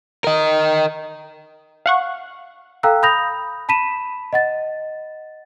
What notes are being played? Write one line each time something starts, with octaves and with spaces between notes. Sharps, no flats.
A#4 D#5
F5 F#5 C#6
A4 F5 G5 A#5 E6 F#6
B5 D#6 G6 A#6 F7
A5 B5 B6 D#7 E7
D#5 F#5 A6